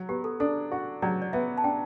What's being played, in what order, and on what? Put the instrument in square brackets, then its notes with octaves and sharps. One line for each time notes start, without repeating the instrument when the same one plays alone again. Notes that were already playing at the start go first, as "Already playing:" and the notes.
Already playing: [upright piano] F#3
[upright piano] B3 [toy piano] G4
[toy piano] A4
[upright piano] D4 [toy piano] A4
[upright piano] F#4
[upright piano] F#3 [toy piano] D5
[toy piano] D5
[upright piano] B3 [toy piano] E5
[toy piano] A5
[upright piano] D4 [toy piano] G5